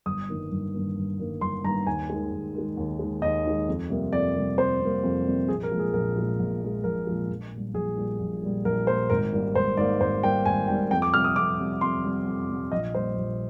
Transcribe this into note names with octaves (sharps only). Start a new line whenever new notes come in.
G1 D#6
G2 D#3 A#3
G1
G2 D#3 A#3
G1
G2 D#3 A#3
G1 C6
G2 D#3 A#3 A#5
D#2 G#5
D#3 G#3
D#2
D#3 G#3
D#2
D#3 G#3
D#2 D#5
D#3 G#3
F2
C3 G3 A#3
F2 D5
C3 G3 A#3
F2 C5
C3 G3 A#3
F2
C3 G3 A#3
A#1 G#4
A#4
A#2 F3 G#3
G#4
A#1 A#4
A#2 F3 G#3
A#1
A#2 F3 G#3
A#1 A#4
A#2 F3 G#3
A#1
A#2 G3
A#1 G#4
A#2 G3
A#1
A#2 G3
A#1 A#4
A#2 G3 C5
G#1 A#4
G#2 G3 A#3
G#1 C5
G#2 G3 A#3 D5
G#1 C5
G#2 G3 A#3 G5
G#1 G#5
G#2 G3 A#3 G5
F2 G5
D6
C3 G3 F6
D#6
F2 D6
C3 G3
F2 C6
C3 G3
F2
C3 G3
A#1 D#5
A#2 G3 C5
A#1